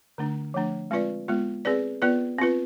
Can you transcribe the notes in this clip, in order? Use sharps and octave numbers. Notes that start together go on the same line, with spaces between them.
D3 A3 D4
F3 A3 D4
G#3 C4 F4 B4 D5
G#3 B3 F4
C4 G#4 B4 D5
B3 F4 B4 D5
C4 F4 B4